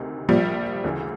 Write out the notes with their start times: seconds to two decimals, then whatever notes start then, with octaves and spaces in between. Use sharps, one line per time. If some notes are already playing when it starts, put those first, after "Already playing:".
Already playing: D2 C3 D#3
0.29 A#1 A#2 F3 G3
0.84 D2 C#3 E3